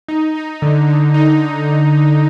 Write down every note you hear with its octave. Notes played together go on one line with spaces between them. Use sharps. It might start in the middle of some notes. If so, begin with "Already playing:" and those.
D#4
D#4
D3
D3
D#4